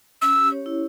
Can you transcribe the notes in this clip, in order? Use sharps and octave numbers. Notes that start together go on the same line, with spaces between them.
C#4 E6
G4
C#5
E4